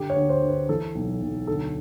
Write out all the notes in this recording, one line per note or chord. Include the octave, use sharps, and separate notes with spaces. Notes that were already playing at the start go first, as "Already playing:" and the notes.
Already playing: D3 G4
C#5
D2
C5
D3
B4
E3 A4
B1
B1
D2 A4